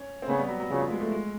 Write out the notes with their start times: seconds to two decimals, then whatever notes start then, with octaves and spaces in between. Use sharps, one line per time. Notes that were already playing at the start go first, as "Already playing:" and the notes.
Already playing: C#4
0.22 C4
0.28 C#3 B3
0.39 G3
0.49 F#3
0.60 F#3
0.70 C#3 F3
0.80 F#3
0.90 G#3
1.01 A3
1.12 G#3